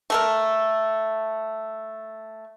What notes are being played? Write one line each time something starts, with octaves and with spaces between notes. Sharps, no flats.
A3 A4 A#4